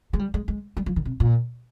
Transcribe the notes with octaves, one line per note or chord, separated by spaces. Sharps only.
G#3
G3
G#3
G#3
G3
F3
D#3
C3
A#2